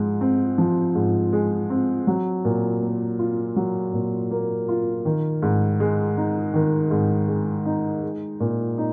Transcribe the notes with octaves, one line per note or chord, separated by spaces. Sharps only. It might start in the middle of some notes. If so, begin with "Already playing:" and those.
Already playing: G#2 F3 G#3
C4
F3
G#2
G#3
C4
F#3
A#2
A#3
F4
F#3
A#2
A#3
F4
D#3
G#2
G#3
D#4
D#3
G#2
G#3
D#4
G#3
A#2
D#4